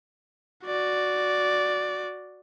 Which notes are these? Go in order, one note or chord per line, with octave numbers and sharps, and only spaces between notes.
F#4 D5